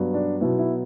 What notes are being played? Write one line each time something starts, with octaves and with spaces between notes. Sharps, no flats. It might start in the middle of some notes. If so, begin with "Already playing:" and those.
Already playing: G2 F#3 B3
D4
B2 F#3 B3 E4
E4